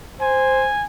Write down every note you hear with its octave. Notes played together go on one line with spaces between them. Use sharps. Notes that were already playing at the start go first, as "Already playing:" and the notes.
C5 G#5